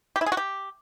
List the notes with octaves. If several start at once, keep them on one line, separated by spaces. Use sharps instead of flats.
G4
E4
G#4
F#4
G4